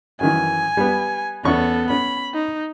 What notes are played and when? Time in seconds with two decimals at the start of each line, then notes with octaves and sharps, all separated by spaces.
0.21 F#2 D#3 E3 G#5
0.77 G3 B3
1.45 E2 B3 C#4 A4 C#6
1.90 C#4 B5
2.34 D#4